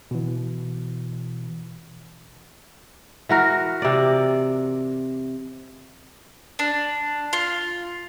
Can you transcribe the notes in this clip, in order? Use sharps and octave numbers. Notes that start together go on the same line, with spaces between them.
B2 E3
E3 F#4 A#4
C3 D5
D4
F4